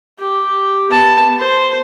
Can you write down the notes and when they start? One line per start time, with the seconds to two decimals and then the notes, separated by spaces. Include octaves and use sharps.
0.19 G4
0.90 B3 A5
1.38 C5